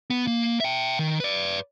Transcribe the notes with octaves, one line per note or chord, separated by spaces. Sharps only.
B3
A#3
E5 G5
D#3
B4 D5